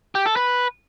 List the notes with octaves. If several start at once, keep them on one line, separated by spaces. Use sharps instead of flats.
G4
A4
B4